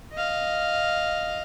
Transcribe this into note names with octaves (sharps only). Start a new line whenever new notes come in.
D#5 F5